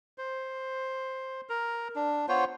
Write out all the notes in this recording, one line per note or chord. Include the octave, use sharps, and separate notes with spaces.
C5
A#4
D4
B3 F4 C5 C#5